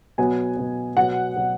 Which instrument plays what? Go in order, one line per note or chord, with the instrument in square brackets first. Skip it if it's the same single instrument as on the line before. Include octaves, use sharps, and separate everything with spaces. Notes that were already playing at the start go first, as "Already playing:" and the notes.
[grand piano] B2 F#3 B3 G#5
B2 F#3 B3
B2 F#3 B3 F#5
B2 F#3 B3